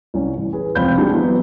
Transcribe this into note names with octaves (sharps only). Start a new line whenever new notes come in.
C2 C#4
A1
G#4 B4
F1 C#2 C4 F5 B5 G6
G3 G#3 D4 D#4 F#4 G#4
E3 F#3 B3 F#4